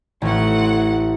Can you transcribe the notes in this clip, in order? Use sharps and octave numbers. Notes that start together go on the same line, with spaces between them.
A1 A3 C4 F#5